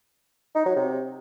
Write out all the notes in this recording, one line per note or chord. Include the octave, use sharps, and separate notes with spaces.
D#4
F#3
C3